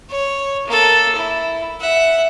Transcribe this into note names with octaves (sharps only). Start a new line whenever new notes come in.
C#5
A#3 A4
E4
E5 F#5